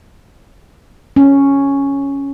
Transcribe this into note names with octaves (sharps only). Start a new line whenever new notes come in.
C#4